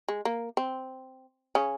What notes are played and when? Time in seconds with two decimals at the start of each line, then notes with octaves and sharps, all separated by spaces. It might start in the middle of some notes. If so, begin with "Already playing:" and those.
0.08 G#3
0.25 A#3
0.57 C4
1.55 C#3 C#4